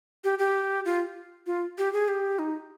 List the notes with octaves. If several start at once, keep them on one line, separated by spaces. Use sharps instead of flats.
G4
G4
F4
F4
G4
G#4
G4
D#4